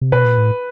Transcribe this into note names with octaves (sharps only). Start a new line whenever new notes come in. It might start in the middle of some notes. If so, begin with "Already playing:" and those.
C3
B2 B4
A#2
A2